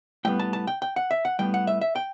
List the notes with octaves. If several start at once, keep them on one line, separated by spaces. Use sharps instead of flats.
A2 G3 B3 G5
A5
A5
G5
G5
F#5
E5
F#5
A2 G3 B3 G5
F#5
E5
E5
G5